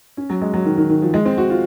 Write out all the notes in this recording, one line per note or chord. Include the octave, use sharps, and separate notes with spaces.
C#4
F#3
G#3
F#3
D#3
D#3
D#3
F3
G#3
C4
F#4
F4